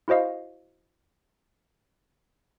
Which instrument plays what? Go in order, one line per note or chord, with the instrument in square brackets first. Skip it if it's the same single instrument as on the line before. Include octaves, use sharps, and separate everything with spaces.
[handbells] E4 F#4 C5 D#5 F5